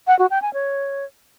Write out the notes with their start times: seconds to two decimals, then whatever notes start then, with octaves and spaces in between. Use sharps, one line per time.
0.07 F#5
0.19 F#4
0.31 G5
0.42 G#5
0.54 C#5